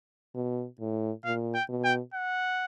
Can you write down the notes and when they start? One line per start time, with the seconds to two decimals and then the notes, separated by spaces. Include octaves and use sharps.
0.35 B2
0.80 A2
1.24 A#2 F5
1.54 G5
1.69 B2
1.84 G5
2.14 F#5